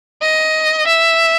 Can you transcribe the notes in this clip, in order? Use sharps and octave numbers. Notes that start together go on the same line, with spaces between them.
D#5
E5